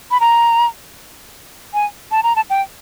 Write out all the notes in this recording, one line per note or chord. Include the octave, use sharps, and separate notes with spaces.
B5
A#5
G#5
A5
A#5
A5
G5